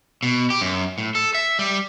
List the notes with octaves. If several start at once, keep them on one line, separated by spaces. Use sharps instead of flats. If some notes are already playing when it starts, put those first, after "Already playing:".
B2
G4
F#2
A2
A4
E5
G3